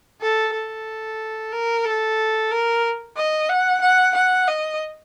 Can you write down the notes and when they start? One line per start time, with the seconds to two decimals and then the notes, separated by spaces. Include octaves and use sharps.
0.21 A4
0.53 A4
1.52 A#4
1.85 A4
2.51 A#4
3.16 D#5
3.49 F#5
3.81 F#5
4.14 F#5
4.47 D#5